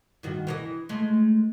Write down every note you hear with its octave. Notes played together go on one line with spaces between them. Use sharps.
G2 D#3 F#4
E3 A4 D#5
G#3 A3